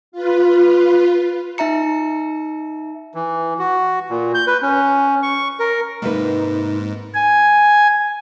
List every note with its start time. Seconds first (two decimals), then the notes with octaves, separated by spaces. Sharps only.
0.12 F4 B4
1.58 D#4 E5 A#5 C#7
3.15 E3
3.59 F#4
4.10 A#2
4.34 G6
4.47 B4
4.62 C#4
5.23 C#6
5.60 A#4
6.02 G#2 C3 A#3 D#4 B4
7.15 G#5